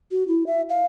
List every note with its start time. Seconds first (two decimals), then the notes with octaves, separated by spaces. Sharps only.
0.11 F#4
0.28 E4
0.47 E5
0.69 F5